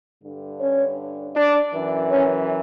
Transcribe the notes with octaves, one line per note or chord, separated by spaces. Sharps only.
G2 D3
C#4 C#5
D4 D5
F#2 E3
C#4 C#5